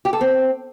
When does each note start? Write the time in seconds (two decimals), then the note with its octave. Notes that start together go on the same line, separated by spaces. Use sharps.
0.05 G4
0.13 A4
0.21 C4